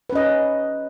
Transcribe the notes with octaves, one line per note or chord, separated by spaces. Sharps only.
C#4 B4 D#5